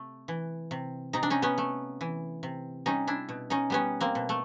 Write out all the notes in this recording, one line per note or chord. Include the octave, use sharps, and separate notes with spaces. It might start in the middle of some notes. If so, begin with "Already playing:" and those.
Already playing: C3 A3
E3
C3
C3 D#4
D4
C#4 D#4
B3 C#4
A3
E3
C3
G3 C#4 D#4
D4 E4
B2
C#4 D#4
G3 B3 C#4
A#3 C4
B2
A3